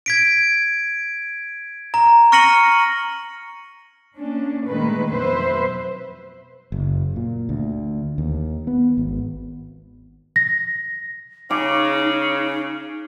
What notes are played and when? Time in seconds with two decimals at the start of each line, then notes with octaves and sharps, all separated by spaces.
0.06 G#6 B6 D7
1.94 A#5
2.32 C#6 F6 A#6 C#7 D#7 F#7
4.16 A#3 C#4 D4
4.67 A#2 D#3 G#3 A3 B4
5.12 F2 B2 F#3 B4 C5 E5
6.72 F#1
7.16 A#2
7.49 D2
8.18 D#2
8.67 B3
8.97 G#1
10.36 A#6
11.50 C#3 D#4 D6